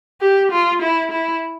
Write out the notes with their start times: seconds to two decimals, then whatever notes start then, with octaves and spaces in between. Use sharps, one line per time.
0.21 G4
0.51 F4
0.82 E4
1.11 E4